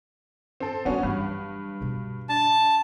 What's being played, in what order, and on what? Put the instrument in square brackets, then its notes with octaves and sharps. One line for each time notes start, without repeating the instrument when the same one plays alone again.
[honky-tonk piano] C4 A4
[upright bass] G3 D4 [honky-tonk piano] B3 C#4 F#4
[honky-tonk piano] G2 [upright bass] E3 F#3
[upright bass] B2 D3
[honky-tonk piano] D4 [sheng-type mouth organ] A5